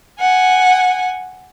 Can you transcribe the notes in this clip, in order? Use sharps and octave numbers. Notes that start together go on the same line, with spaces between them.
F#5 G#5